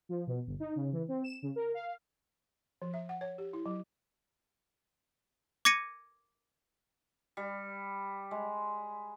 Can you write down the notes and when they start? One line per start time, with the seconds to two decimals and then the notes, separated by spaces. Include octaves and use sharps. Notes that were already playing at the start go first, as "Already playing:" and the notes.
0.09 F3
0.27 B2
0.47 G1
0.60 D#4
0.76 C#3
0.93 E3
1.08 C4
1.24 E7
1.42 C#3
1.56 A#4
1.74 F5
2.82 F3
2.94 E5
3.09 F#5
3.21 C#5
3.38 G4
3.53 E4
3.66 F#3
5.65 D6 G#6 A#6 C#7 D#7
7.37 G3
8.31 G#3